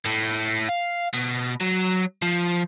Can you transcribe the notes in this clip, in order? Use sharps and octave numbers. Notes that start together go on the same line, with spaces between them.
A2
F5
B2
F#3
F3